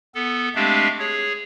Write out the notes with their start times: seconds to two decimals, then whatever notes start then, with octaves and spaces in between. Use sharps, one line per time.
0.15 B3 A4
0.55 G#3 A3 C4 D4 G4 F5
0.99 G#4 C#5